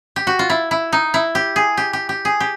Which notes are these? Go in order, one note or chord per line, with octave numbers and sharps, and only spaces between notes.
G4
F#4
F4
E4
E4
D#4
E4
G4
G#4
G4
G4
G4
G#4
G4